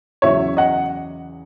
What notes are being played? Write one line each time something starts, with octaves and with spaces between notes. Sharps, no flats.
E2 C#3 F#3 C#5 E5
D#5 F#5